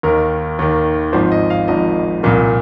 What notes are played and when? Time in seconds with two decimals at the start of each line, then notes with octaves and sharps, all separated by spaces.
0.03 D#2 D#3 A#4
0.59 D#2 D#3
1.13 G#1 G#2 F3 C5
1.31 D#5
1.50 F5
1.68 G#1 G#2 F3 D#5
2.23 C2 A#2 F3 A#4